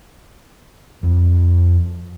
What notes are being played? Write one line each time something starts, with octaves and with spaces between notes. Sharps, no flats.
F2